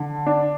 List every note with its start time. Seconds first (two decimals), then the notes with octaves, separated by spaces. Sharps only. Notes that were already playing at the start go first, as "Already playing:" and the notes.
Already playing: D3
0.26 D4